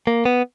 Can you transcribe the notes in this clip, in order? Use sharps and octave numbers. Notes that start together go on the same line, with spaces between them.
A#3
B3